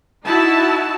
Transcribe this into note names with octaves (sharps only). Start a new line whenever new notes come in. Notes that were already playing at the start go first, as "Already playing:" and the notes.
D#4 E4 F#4 A5